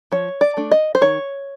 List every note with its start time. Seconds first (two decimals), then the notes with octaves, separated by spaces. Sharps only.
0.12 F3 C#5
0.41 D5
0.57 A3 D4
0.71 D#5
0.95 C5
1.01 D#3 C#5